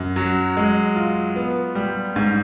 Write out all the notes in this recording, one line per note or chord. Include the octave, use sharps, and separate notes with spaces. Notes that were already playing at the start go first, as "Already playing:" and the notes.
Already playing: F#2
F#3
G#3
F4
B3
G3
G#2